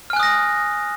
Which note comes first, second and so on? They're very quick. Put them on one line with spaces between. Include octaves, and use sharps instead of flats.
F6 G#5 F#6 D#6 A#6